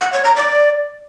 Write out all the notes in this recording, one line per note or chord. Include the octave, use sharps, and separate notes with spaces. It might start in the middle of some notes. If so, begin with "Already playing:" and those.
F#5
C#5
A#5
D5